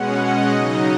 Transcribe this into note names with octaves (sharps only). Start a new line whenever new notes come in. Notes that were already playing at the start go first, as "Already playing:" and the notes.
Already playing: B2 G#3 C#4 F#5
D#5
C#3 F#3 D#4 D#5